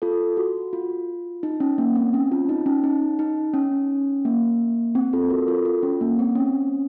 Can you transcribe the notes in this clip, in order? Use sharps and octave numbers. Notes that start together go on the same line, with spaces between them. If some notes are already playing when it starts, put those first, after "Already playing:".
F4 A4
F#4
F4
D#4
C#4
A#3
C4
C#4
F4
D#4
C#4
D#4
D#4
C#4
A#3
C4
F4 A4
F#4 A#4
F4 A4
F4
C#4
A#3
C4
C#4